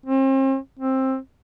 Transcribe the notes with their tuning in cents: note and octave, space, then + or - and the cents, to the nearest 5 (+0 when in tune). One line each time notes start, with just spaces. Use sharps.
C4 +40
C4 +15